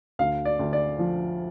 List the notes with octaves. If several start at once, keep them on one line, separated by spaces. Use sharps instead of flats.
D2 F5
D5
D2
D5
F3